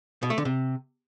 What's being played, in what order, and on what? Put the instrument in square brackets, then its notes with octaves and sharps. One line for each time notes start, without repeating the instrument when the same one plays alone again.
[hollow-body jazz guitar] B2
A3
D3
C3